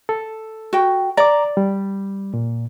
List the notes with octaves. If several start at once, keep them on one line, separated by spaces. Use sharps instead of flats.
A4
F#4 G5
D5 A#5 D6
G3
A#2